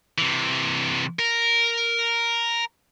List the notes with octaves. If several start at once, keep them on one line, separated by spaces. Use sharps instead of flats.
C3 E3
A#4